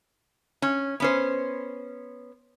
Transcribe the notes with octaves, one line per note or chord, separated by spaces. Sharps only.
C#4
B3 C#4 C5